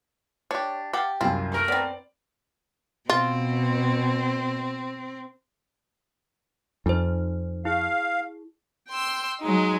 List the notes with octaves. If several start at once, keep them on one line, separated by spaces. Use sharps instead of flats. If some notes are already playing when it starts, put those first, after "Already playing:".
D4 G4 C#5
G4 F5 F#5 A5
C2 F#2 G3 C4 E4 F4
A3 A#4
B3 C4 D5
B2 C4 F4
F2 D#4 C5
E4 G#4 F5
G5 C6 E6
F#3 G#3 D#4